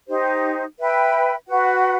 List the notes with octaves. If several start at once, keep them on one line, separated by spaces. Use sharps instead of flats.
D#4 G4 C5
B4 E5 G5 B5
F#4 B4 F#5